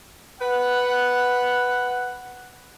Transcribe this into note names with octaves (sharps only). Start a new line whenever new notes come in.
B4 F#5